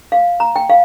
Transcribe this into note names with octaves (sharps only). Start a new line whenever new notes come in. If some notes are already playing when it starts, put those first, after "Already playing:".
F5
A#5
G5
F5